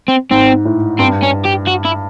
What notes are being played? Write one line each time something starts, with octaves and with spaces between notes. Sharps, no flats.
C4
G#2 C4
A2
G2 C4
C#4
G4
F#4
E4